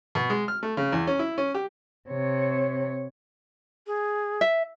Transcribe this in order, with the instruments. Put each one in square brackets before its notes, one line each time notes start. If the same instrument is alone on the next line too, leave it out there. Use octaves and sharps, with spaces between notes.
[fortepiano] B2
G#3
F6
A3
C#3
E2
C#4
E4
C#4
G4
[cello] C3 C#5
[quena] G#4
[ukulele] E5